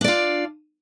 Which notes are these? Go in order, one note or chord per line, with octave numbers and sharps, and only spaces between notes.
D4 F4 D5